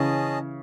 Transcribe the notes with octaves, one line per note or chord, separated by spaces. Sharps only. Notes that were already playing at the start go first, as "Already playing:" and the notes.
Already playing: C#3 E3 C#4 G#4 D#5 A5